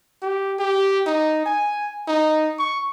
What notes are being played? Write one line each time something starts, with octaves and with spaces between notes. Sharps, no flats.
G4
G4
D#4
G#5
D#4
C#6